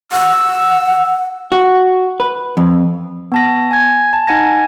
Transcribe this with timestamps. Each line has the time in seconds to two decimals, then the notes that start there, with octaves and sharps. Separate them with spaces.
0.12 F#5 E6
1.52 F#4
2.20 B4
2.57 F2
3.32 B3 A5 A#6
3.71 G#5 G#6
4.13 A5
4.27 D#4 F#5 G#5 G#6 A#6